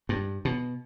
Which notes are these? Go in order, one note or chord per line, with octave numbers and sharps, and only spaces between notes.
G2
B2